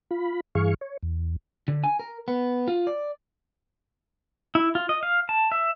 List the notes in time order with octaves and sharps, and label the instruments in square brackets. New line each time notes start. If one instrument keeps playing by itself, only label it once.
[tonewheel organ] F4 B5
G2 E3 G#4 F5 C#6
C#5
E2
[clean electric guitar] D3
G#5
A#4
B3
F4
D5
[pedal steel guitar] E4
F4
D#5
F5
A5
E5